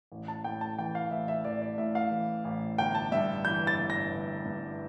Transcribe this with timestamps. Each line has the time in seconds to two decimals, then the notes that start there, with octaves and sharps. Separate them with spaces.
0.12 A1
0.28 A5
0.44 A2 G5
0.61 A5
0.78 E3 G5
0.95 F5
1.11 A1 E5
1.28 E5
1.44 A1 D5
1.62 D5
1.78 A2 E5
1.95 F5
2.11 E3
2.45 A1
2.78 G1 G5
2.95 A5
3.12 G2 E5
3.45 E3 G6
3.67 A6
3.79 G1
3.90 A#6
4.12 G1
4.45 G2